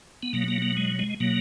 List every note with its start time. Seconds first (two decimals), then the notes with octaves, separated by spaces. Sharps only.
0.23 B3
0.33 B2 F#3 A#3
0.48 A#3
0.62 A#3
0.77 G#3
0.99 G#3
1.20 B2 F#3 A#3